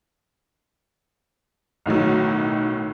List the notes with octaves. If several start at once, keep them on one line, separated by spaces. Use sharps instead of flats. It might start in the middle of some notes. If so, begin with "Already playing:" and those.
B1 A2 D#3 F#3